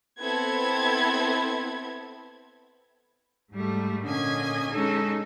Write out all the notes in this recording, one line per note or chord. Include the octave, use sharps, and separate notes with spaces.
B3 C4 E4 A4 G#6
G#2 G3 A3
A#2 D3 C#4 D#5 G#5 G#6
G#3 C#4 D#4 A4